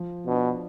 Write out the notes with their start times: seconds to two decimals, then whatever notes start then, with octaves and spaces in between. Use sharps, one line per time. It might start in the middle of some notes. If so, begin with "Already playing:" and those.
Already playing: F3
0.26 B2 D4